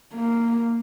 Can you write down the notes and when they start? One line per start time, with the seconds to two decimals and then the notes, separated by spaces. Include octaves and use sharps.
0.14 A#3